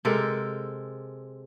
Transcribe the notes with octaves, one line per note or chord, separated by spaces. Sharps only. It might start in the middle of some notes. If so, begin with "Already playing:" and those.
C3 G#3 A4 A#4